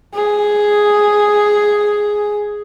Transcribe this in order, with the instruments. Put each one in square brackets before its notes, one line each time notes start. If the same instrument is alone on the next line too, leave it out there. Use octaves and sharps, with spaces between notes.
[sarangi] G#4